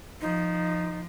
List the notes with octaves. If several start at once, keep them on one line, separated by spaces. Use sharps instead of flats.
F3 D#4